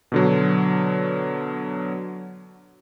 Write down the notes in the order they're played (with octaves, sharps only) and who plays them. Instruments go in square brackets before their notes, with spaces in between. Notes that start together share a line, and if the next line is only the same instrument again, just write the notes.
[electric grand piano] B2 D3 F#3